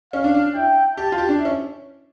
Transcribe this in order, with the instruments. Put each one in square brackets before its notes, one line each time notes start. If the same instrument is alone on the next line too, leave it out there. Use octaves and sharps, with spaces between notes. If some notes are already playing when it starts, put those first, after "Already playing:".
[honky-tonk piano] C#4 [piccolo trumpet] F5
[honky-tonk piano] D4
D4
[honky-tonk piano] E4 [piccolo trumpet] G5
[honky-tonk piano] G4 [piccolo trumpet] A5
[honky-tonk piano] F4
G4
D4
E4
C#4